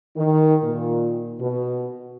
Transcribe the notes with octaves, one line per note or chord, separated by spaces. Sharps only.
D#3
A#2
B2